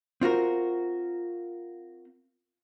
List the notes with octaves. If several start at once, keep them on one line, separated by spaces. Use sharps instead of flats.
C4 F4 F#4 A#4